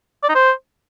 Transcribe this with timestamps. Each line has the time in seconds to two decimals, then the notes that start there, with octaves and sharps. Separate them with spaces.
0.23 D5
0.29 D#4
0.35 C5